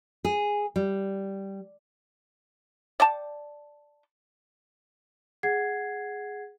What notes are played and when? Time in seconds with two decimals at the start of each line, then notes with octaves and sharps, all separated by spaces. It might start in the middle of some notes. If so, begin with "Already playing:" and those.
0.25 G#4
0.76 G3
3.00 D5 G5 A5
5.43 G#4 F#5 G#6 C7